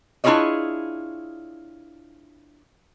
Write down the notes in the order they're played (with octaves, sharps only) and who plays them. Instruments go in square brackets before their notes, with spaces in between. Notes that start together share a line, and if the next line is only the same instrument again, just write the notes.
[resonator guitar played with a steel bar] D4 E4 F4 G#4 C#5 D#5